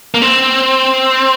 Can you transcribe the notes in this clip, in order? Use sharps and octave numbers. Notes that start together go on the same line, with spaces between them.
A#3
C4